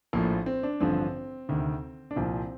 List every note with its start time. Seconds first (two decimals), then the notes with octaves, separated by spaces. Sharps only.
0.13 A#1 A2 F3 A#3
0.46 C4
0.63 D4
0.80 A1 G2 D3 F3 C4
1.49 D2 C3 D#3
2.11 D4
2.16 C2 A#2 F3 C4